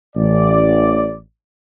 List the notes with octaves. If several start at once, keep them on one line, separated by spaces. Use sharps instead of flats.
A1 D5